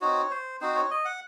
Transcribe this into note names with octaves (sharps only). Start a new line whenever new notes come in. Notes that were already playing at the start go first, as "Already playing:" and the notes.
C4 D#4 F#4 C#5
C5
C4 D#4 F#4 C5
C#5
D#5
F#5